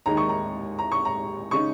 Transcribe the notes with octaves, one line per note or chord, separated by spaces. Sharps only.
D#2 D#3 G#3 D#4 A#5
C#6
A#5
A#5
C#6
A#5
C#3 G#3 D#4 C#6